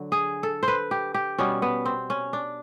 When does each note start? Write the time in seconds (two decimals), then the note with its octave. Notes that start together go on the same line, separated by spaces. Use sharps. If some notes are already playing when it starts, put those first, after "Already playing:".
Already playing: D3 F#3
0.12 G#4
0.43 A4
0.63 C5
0.68 B4
0.91 G4
1.14 G4
1.38 B2 G3 B3 C#4
1.62 B3
1.86 C4
2.10 C#4
2.33 D4